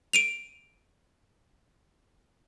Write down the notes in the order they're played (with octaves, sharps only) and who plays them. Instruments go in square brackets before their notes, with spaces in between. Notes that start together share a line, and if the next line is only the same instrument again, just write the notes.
[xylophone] D7 D#7 F7